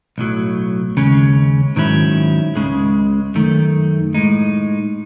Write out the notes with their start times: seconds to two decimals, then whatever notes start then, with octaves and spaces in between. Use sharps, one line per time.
0.18 B1 A2 F#3
0.97 D#2 C#3 G#3 C#4
1.76 G#2 D#3 F#3 C#4 E4
2.56 C#2 C#3 G#3
3.35 F#2 D#3 A3
4.14 A2 G#3 D#4